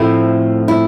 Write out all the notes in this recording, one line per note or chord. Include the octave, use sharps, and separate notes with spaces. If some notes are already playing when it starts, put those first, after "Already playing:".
Already playing: A2 F3 A3 C4 E4
E4